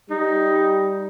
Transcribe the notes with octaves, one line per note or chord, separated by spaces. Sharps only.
G3 D#4